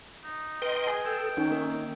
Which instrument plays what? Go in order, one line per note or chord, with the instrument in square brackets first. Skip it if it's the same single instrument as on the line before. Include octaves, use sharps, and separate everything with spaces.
[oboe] D#4
[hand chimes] B4 [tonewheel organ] D#5 G5 C6
[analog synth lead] G#4
[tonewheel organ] A4 [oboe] G5
[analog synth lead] D#3 [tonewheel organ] C#4
[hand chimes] A#3 A#4